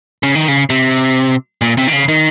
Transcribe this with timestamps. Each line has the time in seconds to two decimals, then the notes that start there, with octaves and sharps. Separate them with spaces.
0.23 C#3
0.35 D#3
0.48 C#3
0.70 C3
1.61 A#2
1.77 C3
1.88 D#3
1.93 C#3
2.08 D#3